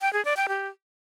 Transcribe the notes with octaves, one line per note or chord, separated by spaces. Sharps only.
G5
G#4
D5
G5
G4